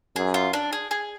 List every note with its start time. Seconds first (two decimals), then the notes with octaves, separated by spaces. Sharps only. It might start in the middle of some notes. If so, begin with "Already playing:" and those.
0.16 F#2 G#4
0.34 F4
0.53 D4
0.73 G#4
0.91 G#4